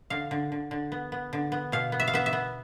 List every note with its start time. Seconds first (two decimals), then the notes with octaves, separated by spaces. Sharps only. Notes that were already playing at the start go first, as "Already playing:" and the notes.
0.10 D3 F5
0.31 D3
0.52 D3
0.71 D3
0.92 B3
1.12 B3
1.33 D3
1.52 B3
1.72 B2 F5
1.92 B3
2.00 E5
2.07 F5
2.13 B3 E5
2.26 E5
2.33 B3